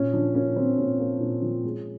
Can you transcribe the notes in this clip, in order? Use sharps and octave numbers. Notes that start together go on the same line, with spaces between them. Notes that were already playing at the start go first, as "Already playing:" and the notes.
Already playing: A#2 C#4
F3 D4
A#3 C#4
F3 C4
A#2 C#4
A#3
A#2
F3
G#3